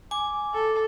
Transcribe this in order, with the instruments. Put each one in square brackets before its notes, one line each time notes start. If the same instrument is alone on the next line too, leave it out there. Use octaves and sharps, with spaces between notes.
[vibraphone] G#5 [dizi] D6
[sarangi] A4